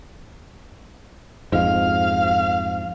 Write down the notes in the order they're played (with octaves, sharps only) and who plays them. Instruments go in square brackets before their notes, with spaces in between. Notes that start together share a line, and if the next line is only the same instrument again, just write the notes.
[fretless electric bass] F2 G#2 [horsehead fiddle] F5